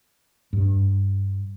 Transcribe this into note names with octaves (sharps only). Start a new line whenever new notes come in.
G2